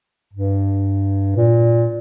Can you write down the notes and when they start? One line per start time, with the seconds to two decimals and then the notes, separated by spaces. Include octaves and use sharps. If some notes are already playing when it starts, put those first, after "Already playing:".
0.33 G2
1.36 A#2